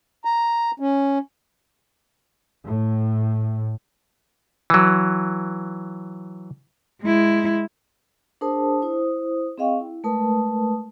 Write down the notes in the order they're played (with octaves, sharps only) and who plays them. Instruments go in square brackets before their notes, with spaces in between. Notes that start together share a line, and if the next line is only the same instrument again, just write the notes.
[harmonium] A#5
C#4
[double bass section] A2
[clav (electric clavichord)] E3 F#3
[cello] G#3 E4
[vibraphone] D4 G#4 A#4 C5 A5 D#6
E4 C5 D#6
C4 G#4 D#5 F5 G5 C#6
E4
G#3 A3 A#4 B4 A5 D#6